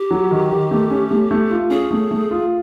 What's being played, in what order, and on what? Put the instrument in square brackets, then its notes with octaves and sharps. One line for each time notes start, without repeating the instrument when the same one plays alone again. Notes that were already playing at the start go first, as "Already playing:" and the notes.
Already playing: [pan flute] G4
[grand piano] F#3
D#3
D#3
A3
C#4
A3
A3
F4
[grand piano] C#4 [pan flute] G#4
[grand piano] A3
A3
F4